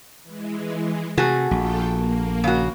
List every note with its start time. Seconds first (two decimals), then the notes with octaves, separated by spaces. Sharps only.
0.24 E3 G#3
1.17 C3 A3 F#4 G#4
1.51 A#1 F4 A4 G5
1.90 A#3
2.44 C#3 F#4